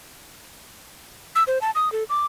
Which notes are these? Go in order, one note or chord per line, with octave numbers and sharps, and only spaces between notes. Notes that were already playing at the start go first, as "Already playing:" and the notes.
E6
C5
A5
D#6
A4
D6